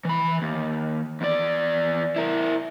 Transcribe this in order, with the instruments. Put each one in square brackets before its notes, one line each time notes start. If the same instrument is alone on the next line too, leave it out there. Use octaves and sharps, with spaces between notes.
[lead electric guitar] E3 B5
D#2
E2 D5
E4 A#4